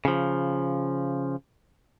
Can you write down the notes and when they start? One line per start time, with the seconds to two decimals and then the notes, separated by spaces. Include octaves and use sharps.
0.05 C#3 F3